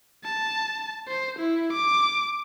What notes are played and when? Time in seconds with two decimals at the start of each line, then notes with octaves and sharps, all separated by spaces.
0.25 A5
1.08 C5
1.39 E4
1.73 D6